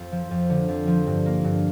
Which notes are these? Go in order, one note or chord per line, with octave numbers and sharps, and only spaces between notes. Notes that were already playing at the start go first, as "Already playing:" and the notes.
Already playing: F2
F3
F2
D3
F2
F3
G2
A#3
G2